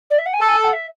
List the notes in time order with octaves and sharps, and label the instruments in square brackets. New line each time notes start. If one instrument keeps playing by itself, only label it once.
[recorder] D5
E5
F#5
G#5
[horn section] A4 [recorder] A5
[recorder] G#5
A5
F#5
E5